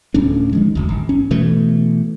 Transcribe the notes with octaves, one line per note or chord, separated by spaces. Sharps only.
D1 D2 C#4 D4
D#3 F3 G#3
F1 D2
G#1
C#4
B2 E3 A3